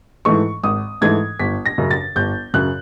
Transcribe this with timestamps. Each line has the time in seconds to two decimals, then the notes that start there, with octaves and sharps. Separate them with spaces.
0.25 G#2 E3 A3 C#6
0.63 G#1 D#6
1.01 G#2 E3 A3 G#6
1.39 G1 B6
1.66 A#6
1.78 F#2 C#3
1.91 A6
2.16 G1 G6
2.54 F#2 C#3 F#6